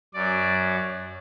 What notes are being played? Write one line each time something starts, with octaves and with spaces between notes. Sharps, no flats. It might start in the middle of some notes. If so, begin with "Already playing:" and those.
F#2 F#3 D5